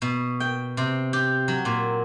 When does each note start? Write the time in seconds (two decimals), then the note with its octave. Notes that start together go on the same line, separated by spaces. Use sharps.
0.02 B2
0.40 G5
0.77 C3
1.13 G4
1.48 F#3
1.65 A#2